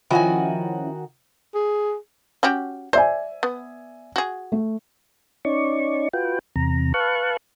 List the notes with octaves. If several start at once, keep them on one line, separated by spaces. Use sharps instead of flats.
D#3 F3 C#4 E4 F#4 G#5
G#4
C#4 F#4 G4
C5 D5 E5 G#5
B3
F#4 G#4
A3
C#4 D#4 D5 C#6
F4 F#4 B4 G5
E2 C3 A#5
B4 F5 A5 C#6 F#6